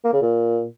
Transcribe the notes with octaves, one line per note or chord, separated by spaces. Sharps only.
A#3
C#3
A#2